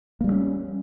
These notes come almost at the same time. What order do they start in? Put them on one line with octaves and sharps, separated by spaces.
A#3 G3 A3 C#4